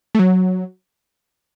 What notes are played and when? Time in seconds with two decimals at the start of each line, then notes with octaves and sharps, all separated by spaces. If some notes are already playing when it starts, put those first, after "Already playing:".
0.15 A3
0.19 F#3